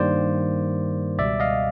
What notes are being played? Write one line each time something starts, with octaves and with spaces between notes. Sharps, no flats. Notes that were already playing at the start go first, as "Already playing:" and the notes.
Already playing: G2 D#3 G3 A#3 C5 D5
C#2 B2 G3 D5 E5
D#5 F5